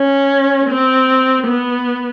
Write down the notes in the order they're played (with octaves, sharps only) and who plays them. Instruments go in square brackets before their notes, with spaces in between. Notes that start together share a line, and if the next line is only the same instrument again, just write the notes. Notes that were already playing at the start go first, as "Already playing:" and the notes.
Already playing: [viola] C#4
C4
B3